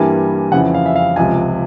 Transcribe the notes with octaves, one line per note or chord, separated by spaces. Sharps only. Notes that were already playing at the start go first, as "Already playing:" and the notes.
Already playing: G2 E3 G3 A#3 G#5
F2 C#3 E3 F#5
F5
E5
F5
C#2 C3 F3 G#5